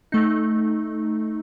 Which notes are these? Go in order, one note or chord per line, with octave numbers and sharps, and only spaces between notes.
A3 D#4